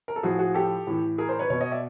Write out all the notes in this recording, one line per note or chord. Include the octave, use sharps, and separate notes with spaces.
A#4
A4
A2 F3 F#4 G#4
F#4 G#4
G4 A4
A2 E3
G#4 A#4
A#4 C5
B4 C#5
B2 B4 C#5
C#5 D#5
D5 E5